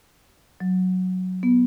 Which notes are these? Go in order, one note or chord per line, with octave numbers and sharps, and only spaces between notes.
F#3
B3